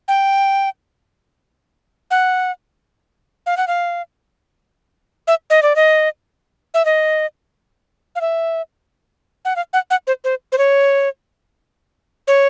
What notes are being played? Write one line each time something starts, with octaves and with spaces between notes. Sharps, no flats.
G5
F#5
F5
F#5
F5
E5
D#5
D5
D#5
E5
D#5
F5
E5
F#5
F5
F#5
F#5
C5
C5
C5
C#5
C#5